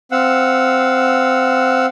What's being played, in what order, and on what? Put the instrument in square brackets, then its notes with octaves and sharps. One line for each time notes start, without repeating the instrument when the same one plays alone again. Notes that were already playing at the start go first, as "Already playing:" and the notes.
[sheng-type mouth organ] C4 F5 F#5 E6